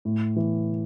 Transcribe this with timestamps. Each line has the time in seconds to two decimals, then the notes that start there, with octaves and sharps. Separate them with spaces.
0.05 A2
0.36 E3